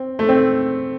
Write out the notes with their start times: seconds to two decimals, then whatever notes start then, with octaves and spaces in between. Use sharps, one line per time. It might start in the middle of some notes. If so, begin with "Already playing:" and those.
Already playing: C4
0.19 A3
0.29 C4